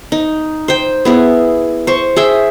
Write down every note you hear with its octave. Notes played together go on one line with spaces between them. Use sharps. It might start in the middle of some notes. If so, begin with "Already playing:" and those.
D#4
C5 G5
B3 E4 G#4
C5 C#6
G#4 E5 G5